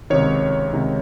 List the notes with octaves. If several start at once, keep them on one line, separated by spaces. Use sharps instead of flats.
C#2 C3 D#3 C#5
C#2 C3 D#3